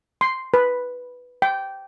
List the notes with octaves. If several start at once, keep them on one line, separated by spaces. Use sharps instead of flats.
C6
B4
G5